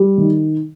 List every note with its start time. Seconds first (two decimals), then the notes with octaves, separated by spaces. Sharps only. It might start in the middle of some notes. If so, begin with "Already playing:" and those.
Already playing: G3
0.18 D#3